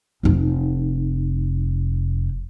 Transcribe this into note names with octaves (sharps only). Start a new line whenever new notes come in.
F1 D#4